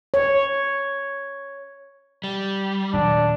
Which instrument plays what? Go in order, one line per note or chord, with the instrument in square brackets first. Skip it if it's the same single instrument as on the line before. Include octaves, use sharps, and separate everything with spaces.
[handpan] C#5
[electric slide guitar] G3
[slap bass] D#1 F#3 [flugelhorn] D4